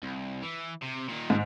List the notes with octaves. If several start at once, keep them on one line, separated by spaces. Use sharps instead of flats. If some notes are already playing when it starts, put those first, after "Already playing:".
C2
E3
C3
A#2 D#3
G#2